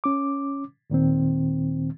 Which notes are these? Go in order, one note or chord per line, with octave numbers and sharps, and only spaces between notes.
C#4 D6
D#2 A#2 D#3 C4